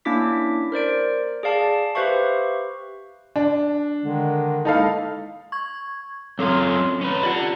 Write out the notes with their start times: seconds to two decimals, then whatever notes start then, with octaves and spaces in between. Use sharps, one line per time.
0.05 A#3 C#4 D4 E4 D6 B6
0.72 A#4 C5 D5 D7
1.43 G#4 D5 F5 A5
1.95 G4 B4 C5 E5 F5 C#6
3.36 D4
4.03 D3 D#3 G#3
4.65 G#3 A#3 D#4 E4 A4 F5
5.52 C#6 G#6
6.39 F#3 C4 C#4 F4 A4 C6
7.01 C#4 B4
7.23 F4 G4 D5 F#5